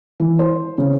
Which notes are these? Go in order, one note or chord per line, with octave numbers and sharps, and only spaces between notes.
E3
C5
C#3